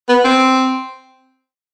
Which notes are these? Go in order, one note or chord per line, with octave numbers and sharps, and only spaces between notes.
B3
C4